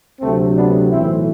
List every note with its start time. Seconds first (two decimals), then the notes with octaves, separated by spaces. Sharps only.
0.20 D2 C3 F#3 A3 C4
0.55 B3 D4
0.90 B1 A2 E3 C4 E4